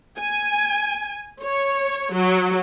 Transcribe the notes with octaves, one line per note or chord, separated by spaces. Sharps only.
G#5
C#5
F#3